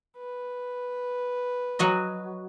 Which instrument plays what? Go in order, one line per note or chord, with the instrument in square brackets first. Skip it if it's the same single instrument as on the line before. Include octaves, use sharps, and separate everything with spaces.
[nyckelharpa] B4
[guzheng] F#3 F#4 D#5